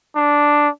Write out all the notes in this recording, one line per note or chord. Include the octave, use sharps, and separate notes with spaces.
D4